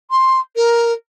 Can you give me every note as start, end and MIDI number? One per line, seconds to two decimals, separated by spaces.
0.10 0.40 84
0.56 0.92 70